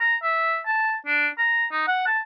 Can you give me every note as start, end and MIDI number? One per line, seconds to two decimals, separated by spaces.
0.01 0.16 82
0.23 0.60 76
0.66 0.94 81
1.06 1.28 62
1.38 1.66 82
1.72 1.85 63
1.88 2.05 78
2.07 2.19 81